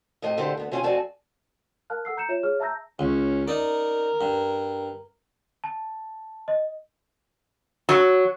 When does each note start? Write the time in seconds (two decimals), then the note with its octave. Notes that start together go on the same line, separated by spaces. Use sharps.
0.22 F2 A2 C3 D#5
0.37 A#2 D3 E4 G4 C5
0.58 D2 B3
0.71 C3 E3 C#4 F4 G#5
0.83 F2 C4 F#4 D5 G#5 A5
1.90 A#4 F5 A5 F6 F#6
2.05 A4 F#5 E6 C7
2.17 A#5 G6 C#7 E7
2.29 F4 C#5 E5 E7
2.43 G#4 C#5 F6
2.60 E5 A5 A#5 E6 G6 A#6
2.99 C#2 C#4
3.48 D#4 A#4 D5
4.21 G2
5.64 A5
6.48 D#5
7.89 F#3